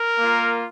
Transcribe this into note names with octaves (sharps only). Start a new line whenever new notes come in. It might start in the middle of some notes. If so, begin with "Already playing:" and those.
Already playing: A#4
A#3 F4